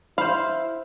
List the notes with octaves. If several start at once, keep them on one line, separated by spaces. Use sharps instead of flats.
E4 C5 F5 B5